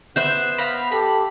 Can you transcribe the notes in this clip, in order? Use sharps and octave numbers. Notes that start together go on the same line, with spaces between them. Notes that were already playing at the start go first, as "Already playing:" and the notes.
B3 C5 E5 F#6 G6
F5 A#5 B5
G4 A4 B5